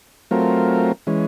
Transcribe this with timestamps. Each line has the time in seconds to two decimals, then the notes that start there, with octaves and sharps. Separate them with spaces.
0.31 F#3 A3 C4 F4 A#4
1.07 E3 G#3 C#4